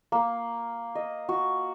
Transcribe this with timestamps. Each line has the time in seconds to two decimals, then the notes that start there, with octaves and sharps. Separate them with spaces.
0.12 A#3
0.95 D#5
1.29 F#4